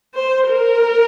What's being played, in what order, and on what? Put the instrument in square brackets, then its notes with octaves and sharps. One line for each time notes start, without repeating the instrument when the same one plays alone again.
[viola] C5
A#4